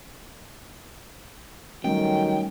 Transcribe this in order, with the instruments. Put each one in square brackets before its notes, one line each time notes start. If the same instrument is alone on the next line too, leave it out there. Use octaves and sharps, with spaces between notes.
[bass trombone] D#3 [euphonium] F#3 [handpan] G3 A3 C#4 [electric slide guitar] G5